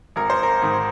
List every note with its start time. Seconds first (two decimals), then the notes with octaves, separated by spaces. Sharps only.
0.16 G#1 A#4
0.30 C5
0.43 A#4
0.62 G#2 D#3